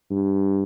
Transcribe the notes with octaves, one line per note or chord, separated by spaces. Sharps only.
G2